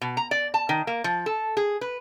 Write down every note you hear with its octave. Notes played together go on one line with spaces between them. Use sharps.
B2
A#5
D5
A5
D#3
A#3
F3
A4
G#4
B4